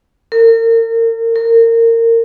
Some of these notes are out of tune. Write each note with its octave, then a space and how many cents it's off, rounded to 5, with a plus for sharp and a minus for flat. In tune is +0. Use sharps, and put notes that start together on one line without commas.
A#4 -35
A#4 -25